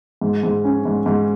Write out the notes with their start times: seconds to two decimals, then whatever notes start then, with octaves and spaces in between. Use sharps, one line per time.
0.21 G#2
0.43 G#2
0.64 C#4
0.86 G#2
1.06 G#2